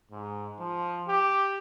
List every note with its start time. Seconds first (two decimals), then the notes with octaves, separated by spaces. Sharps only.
0.11 G#2
0.59 F3
1.08 G4